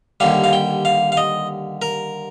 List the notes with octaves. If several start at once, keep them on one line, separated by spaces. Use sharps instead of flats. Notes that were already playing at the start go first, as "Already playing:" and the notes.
D#2 D3 G3 F5
F5
G5
F5
F5
D#5
A#4